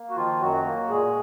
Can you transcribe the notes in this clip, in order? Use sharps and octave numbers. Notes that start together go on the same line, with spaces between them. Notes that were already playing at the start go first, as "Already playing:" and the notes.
Already playing: A#3
F#4
D#3 F3 F4
F#2 F#3 F#4
A#3
A#2 G#3 G#4